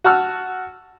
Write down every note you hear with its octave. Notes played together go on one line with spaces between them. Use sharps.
F#4 F#5 A5 E6 F6